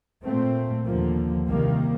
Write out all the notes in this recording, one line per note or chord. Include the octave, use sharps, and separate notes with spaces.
A#2 A3 C4
D#2 D3 F3 A#3
C2 C3 D#3 G3 A#3